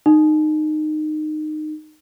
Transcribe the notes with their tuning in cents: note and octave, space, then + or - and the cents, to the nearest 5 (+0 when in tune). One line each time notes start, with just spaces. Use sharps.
D#4 -20